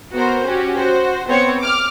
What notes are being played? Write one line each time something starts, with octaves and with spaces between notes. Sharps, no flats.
B3 F#4 A#4 C5
C#4 F#4 G4
F#4 C5
B3 C4 C5 C#5 C#7
D6 F6